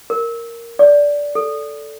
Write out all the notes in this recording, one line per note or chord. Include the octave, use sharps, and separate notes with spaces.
A#4
D5
A4